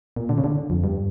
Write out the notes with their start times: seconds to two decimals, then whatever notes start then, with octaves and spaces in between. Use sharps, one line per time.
0.16 A#2
0.29 D3
0.38 C#3
0.44 D3
0.70 F2
0.84 G2